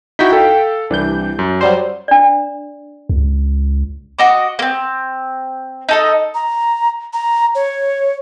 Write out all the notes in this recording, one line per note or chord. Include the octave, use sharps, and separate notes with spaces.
D#4 E4 F#4 G5 B6
A4 F5
C2 E3 G3 D4 G6
F#2
F#3 G3 C5 C7
D4 D5
C#2
F#4 D#5 D6
A#3 C4
D#4 A4 D#5
A#5
A#5
C#5